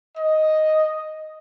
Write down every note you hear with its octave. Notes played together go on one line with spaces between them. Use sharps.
D#5